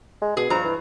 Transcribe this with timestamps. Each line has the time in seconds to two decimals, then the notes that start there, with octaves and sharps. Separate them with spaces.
0.22 G#3
0.37 B2 G#4
0.50 G2 F3 A#5
0.64 E3